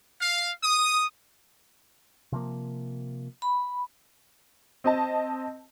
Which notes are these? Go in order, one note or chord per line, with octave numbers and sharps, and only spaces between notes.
F5
D#6
C3 F3 A#3
B5
C4 D#5 A5